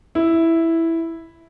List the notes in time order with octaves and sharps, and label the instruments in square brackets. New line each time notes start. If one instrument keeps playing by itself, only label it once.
[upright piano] E4